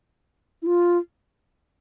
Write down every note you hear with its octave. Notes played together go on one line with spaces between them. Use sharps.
E4
F4